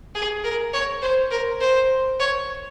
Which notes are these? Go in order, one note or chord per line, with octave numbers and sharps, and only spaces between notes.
G#4
A#4
C#5
C5
A#4
C5
C#5